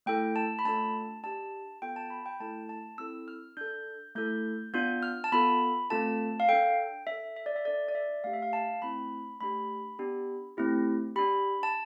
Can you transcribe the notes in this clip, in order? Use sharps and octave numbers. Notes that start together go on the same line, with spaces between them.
A3 E4 A4 G5
A5
B5
A3 D4 F4 A4 A5
D4 G4 A5
B3 F4 A4 G5
A5
B5
G5
A3 E4 A4 A5
A5
C4 E4 A4 E6
F6
D4 A4 G6
A3 E4 A4 G6
B3 D4 F4 G6
F6
A5
B3 F4 A4 B5
A3 C4 F4 A4 A5
F5
D4 A4 G5
D4 A4 E5
E5
D5
E5
D4 A4 D5
D5
E5
A3 D4 G4 F5
E5
F5
A5
A3 C4 E4 B5
A3 D4 G4 B5
B3 D4 G4
A3 C4 E4 G4
D4 G4 B5
A5